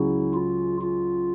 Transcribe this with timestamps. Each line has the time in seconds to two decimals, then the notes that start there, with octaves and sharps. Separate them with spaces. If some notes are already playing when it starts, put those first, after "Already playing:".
Already playing: C#2 C#3 F#3 E4
0.34 F4
0.81 F4